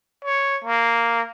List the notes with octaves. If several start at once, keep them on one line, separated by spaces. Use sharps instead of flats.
C#5
A#3